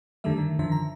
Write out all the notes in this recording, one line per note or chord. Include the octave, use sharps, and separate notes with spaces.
F#2 D3 D#3 G3 A3 E5
D#3
F#2 D3 D#3 F3 E5
A#5